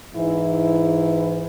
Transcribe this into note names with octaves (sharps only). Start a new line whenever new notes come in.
G#2 E3 E4